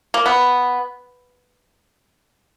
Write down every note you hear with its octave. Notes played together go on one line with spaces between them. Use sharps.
A#3
B3